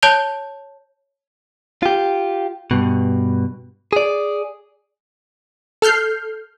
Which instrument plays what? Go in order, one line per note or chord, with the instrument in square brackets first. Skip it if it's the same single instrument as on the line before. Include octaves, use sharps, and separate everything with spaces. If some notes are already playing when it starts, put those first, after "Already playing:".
[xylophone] C#5 A5 G6 F7 G7
[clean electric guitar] F4 G4
G2 B2
G#4 D5
[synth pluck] A4 F6 G6 C7